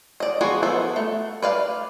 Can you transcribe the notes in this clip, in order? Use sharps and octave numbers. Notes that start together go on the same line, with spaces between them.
D5 D#5
F3 B3 F#4 G#4
F3 B3 A4
A3
B4 D5 F5